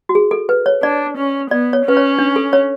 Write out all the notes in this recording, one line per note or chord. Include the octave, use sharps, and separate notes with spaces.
F#4
G#4
A4
B4
C#5
D4 D5
C#4
B3 D5
C#5
C#4 B4
C#5
D4
A4
C#5